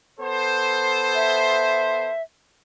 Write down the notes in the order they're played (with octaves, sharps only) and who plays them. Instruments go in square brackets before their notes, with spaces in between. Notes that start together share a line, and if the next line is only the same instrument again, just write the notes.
[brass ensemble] B3 A4 C5
[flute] E5